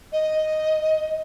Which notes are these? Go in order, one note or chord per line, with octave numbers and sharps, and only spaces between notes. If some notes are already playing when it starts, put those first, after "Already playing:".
D#5